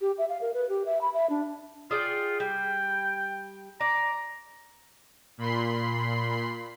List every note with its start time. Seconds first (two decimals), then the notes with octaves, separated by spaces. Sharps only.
0.01 G4
0.18 E5
0.29 F5
0.41 A#4
0.54 B4
0.69 G4
0.86 E5
1.01 B5
1.14 E5
1.30 D4
1.91 F4 G#4 D5 G5
2.40 G3 G5
3.80 D5 A#5
5.38 A#2 B5 C6 C7